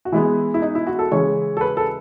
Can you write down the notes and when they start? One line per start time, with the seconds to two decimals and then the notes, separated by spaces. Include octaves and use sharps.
0.05 F#4
0.12 E3 G#3 B3 E4
0.54 E4
0.62 D#4
0.75 E4
0.87 F#4
0.99 A4
1.12 C#3 E3 G#3 C#5
1.57 A4
1.61 B4
1.77 A4